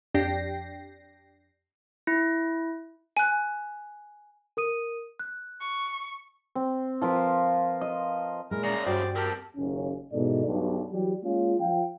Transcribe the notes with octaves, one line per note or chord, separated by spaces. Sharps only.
F2 D4 G4 G5 A#6 C7
E4
G#5 F#6
A#4 D#6 D#7
F#6
C#6
C4
F3 F4 A#4 B4
D#5
A#2 G#3 E4 A#4
F#2 C#3 D5 A#5
G2 F#4 C5 D5 G5
C4 G4 A4 A#4
F#1 D#2 C#4
G#2 B2 E3 D#4 A4 D5
B1 G2
E3 F#3 G3 G4
G#3 A#3 C#4 F4
F3 F5 G5